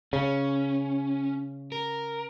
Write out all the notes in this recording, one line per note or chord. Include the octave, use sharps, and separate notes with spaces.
C#3 C#4
A#4